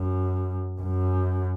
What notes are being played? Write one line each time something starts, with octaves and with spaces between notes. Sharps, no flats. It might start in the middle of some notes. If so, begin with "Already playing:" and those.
Already playing: F#2
F#2